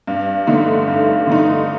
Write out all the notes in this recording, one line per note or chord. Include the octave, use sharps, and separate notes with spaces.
G2
D3 A3 D#4
G2
D3 A3 D#4